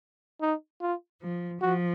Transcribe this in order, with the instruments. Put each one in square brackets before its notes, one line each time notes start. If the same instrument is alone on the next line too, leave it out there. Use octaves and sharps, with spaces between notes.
[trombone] D#4
F4
[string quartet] F3
[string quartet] F3 [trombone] F#4